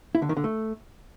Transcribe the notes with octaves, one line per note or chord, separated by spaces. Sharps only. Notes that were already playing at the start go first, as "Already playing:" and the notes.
E4
D3
D#3
D3
A3